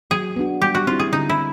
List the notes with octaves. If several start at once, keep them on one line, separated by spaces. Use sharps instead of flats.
F#3 G#4
B3 D4 F#4
G3 G4
F#4
C4 E4 F4
G#4
D3 D#4
E4